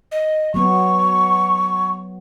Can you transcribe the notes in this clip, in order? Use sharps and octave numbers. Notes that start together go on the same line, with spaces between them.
D#5
F#3 B3 C#6